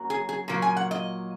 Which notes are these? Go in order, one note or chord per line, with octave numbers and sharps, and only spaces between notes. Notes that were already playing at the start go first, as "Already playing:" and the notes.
Already playing: F#2 F#3 A#3
G#4
G#4
A#2 F#3 A#3
G#5
F#5
D#5